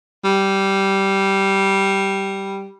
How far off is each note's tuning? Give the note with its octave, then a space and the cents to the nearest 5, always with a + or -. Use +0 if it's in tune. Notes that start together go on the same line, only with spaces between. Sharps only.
G3 -10